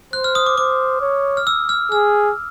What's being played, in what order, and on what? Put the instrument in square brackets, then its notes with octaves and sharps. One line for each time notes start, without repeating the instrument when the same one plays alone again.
[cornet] C5 [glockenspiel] F#6
[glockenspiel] F6
D#6
D6
[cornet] C5 [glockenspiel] D6
[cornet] C#5
[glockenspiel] F6
E6
F6
[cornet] G#4 [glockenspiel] F6